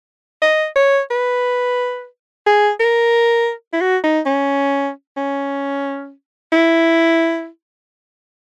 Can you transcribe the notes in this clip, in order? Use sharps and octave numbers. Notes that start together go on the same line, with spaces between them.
D#5
C#5
B4
G#4
A#4
E4
F#4
D#4
C#4
C#4
E4